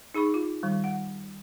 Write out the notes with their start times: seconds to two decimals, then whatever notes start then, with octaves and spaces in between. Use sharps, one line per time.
0.14 D#4 G#4 B5 C#6
0.34 F4
0.63 D#3 G3
0.84 F#5